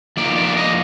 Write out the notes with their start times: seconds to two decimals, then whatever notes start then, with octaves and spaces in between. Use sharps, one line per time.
0.17 F3 A#3 D#4 D5
0.36 D5
0.57 D#5